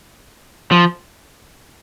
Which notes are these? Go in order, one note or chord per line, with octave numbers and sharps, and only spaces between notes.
F3